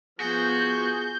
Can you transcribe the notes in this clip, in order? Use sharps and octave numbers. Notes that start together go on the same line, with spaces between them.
F3 B3 F#4 G#4 G6